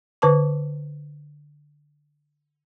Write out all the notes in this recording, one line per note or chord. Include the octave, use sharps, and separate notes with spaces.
D3 B4 A5 D6